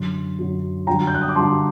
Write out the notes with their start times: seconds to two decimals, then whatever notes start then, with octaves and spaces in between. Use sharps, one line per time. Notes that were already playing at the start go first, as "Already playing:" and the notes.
Already playing: F#2 D3 F#3 C6
0.39 F#2 D3 F#3
0.87 G2 D3 F#3 G5 A#5
1.07 G6
1.14 F#6
1.21 D#6
1.29 D6
1.35 G2 D3 F#3 A5 C6